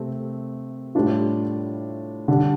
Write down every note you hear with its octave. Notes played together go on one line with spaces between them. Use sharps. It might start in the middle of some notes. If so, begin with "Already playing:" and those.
Already playing: C3 A3 C4
A2 G3 D4 F4
D3 G3 D4